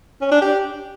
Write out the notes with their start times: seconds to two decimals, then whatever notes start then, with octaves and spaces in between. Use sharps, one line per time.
0.21 C#4
0.31 D4
0.41 G4